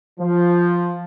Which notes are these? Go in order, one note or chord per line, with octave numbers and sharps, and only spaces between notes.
F3